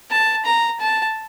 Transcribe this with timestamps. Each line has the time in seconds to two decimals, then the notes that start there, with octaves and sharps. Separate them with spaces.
0.11 A5
0.45 A#5
0.80 A5